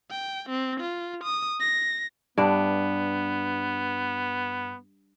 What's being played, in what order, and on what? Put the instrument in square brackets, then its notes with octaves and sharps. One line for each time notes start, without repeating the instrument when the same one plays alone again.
[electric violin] G5
C4
F4
D#6
A#6
[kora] G2 D4 [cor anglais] B3